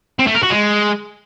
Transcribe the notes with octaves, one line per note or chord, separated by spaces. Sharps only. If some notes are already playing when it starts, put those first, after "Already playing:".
C4
A3
A#4
F#4
G#3